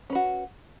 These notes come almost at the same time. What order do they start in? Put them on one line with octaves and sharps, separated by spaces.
C#4 B4 F#4